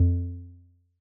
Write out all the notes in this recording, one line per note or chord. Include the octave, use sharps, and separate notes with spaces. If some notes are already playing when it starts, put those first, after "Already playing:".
Already playing: F2